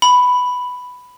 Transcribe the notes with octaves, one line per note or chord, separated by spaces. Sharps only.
B5